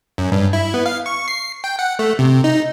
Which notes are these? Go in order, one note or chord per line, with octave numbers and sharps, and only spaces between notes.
F#2
G2
E4
B3
F5
C#6
C7
G5
F#5
A3
C3
D#4